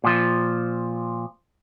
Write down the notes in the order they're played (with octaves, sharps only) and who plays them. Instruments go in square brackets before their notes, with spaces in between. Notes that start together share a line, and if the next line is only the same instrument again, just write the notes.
[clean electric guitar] A#2 F3